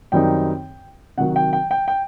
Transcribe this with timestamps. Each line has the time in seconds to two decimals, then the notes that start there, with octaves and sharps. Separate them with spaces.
0.12 F#2 D#3 G3 C4 D#4 G5
1.17 C3 D#3 F#3 F#5
1.36 G5
1.53 G5
1.71 G5
1.88 G5